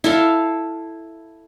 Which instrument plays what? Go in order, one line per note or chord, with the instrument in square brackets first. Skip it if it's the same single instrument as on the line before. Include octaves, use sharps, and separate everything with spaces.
[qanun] E4 A4 F5